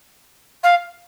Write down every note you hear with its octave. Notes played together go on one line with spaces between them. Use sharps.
F5